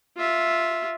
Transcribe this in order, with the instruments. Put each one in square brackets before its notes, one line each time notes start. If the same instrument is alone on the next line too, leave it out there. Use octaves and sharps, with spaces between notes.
[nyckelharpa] F4 E5